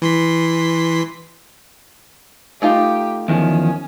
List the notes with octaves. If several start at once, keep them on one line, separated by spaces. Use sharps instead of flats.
E3 C6 B6
A3 D#4 F4 G4
E2 D#3 F3 C#4